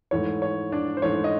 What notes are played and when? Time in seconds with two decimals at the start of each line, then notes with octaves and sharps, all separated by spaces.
0.11 G#2 E3 A3 C#5
0.42 C#5
0.72 D4 D5
0.97 C5
1.02 G#2 E3 A3 C#5
1.24 D#5